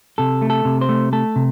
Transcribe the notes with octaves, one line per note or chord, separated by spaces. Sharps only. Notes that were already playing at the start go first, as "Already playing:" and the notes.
C3 A4
A3
A4
C3
C5
A3
A3 A4
C3